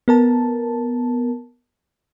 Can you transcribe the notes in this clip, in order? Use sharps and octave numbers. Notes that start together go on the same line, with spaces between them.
B3 A#4 A5